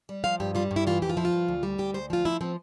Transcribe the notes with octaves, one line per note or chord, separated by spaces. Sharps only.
G3
F3 F5
G2 G4
G3 F4
G2
E4
E3 F4
F2 G4
F4
F3 E4
F4
G2
D2
G3
D2 G4
D2 C5
F3 F4
F3 E4
F3 C4